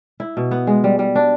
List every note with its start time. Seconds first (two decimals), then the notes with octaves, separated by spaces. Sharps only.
0.20 E4
0.37 B2
0.51 B3
0.67 G#3
0.84 G3
0.99 G3
1.15 D4